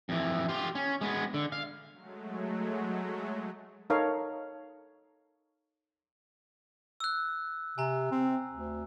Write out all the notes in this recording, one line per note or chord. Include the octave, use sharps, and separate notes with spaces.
F2 E3
F4 G4
C#4
G#3 B3
D3
F5
F#3 G#3 A3
D#4 A4 A#4 C#5 F5
E6 F#6
C3 G#5 A#5
C4
D2